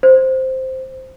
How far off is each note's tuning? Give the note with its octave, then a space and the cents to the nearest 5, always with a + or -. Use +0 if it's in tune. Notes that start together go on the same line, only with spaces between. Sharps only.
C5 +0